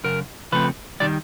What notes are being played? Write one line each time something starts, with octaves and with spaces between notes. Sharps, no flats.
F#2 C#3 A#4
C#3 F3 A3 C4 B4
C3 D#3 G3 D5